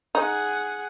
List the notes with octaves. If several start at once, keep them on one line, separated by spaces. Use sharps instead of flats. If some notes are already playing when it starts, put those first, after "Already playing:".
D#4 G#4 F#5